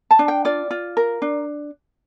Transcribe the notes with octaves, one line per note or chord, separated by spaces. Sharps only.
A5
D4
G5
F4 D5
F4
A#4
D4